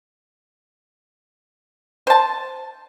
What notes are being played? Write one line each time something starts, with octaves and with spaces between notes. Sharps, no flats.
C5 A5